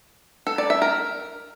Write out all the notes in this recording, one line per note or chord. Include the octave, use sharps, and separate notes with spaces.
A4
D5
E5
A#4